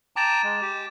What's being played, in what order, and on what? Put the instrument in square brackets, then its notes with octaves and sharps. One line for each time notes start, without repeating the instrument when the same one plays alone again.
[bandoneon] G5 A5 A#5 [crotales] D6 A6 E7
[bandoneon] G#3
G4